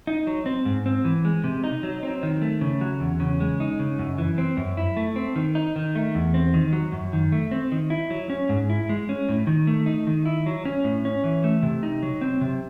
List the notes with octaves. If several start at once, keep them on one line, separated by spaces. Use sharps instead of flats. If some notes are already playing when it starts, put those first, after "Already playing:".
D#4
F#3
C4
G#2
C4
E3
G#3
C3
D#4
F#3
C4
D#3
A3
C#3
F#3
E2
C#3
G#3
D#4
C#3
F#2
E3
C4
F#2
E4
A3
C4
D#3
D#4
D#3
A3
E2
C4
D#3
F#3
F#2
D#3
A3
C4
D#3
E4
F#3
C#4
G#2
E4
G#3
C#4
A2
D#3
A3
D#4
D#3
E4
F#3
C#4
A2
C#4
E3
A3
C3
D#4
F#3
C4
C3